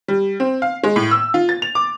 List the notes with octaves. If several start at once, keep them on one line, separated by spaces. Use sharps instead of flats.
G3
C4
F5
G#3
A2
E6
F4
A6
F7
D6